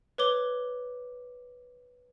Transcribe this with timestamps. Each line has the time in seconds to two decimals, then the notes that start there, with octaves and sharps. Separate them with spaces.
0.18 B4 C#5 D6 G7